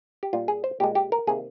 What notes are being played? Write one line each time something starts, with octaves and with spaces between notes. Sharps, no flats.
G4
A#2 G3 A#3 F4
G#4
C5
A#2 G#3 G4
G4
A#4
C3 D#3 A#3 G#4